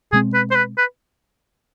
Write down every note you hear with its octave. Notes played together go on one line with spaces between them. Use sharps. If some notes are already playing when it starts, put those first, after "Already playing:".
B2 G#3 C4 G#4
B4
C5
B4
B4